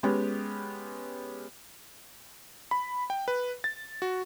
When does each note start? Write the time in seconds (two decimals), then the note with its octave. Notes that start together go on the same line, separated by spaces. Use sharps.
0.03 G#3 B3 C#4 G4
2.71 B5
3.10 G5
3.28 B4
3.64 A6
4.02 F#4